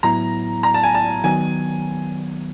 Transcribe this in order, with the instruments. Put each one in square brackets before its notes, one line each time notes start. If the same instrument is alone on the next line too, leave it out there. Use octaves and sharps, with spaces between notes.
[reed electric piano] A2 F#3 B3 E4 [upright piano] A#5
[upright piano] A#5
A5
G#5
A5
[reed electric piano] D#3 F#3 B3 [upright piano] G#5